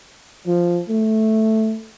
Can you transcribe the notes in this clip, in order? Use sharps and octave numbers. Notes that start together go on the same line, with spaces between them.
F3
A3